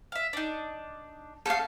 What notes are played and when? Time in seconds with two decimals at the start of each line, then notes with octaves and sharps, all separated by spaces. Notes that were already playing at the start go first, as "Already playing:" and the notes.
0.12 E5 F5
0.33 D4 D#4
1.46 A3 C#4 A4 F5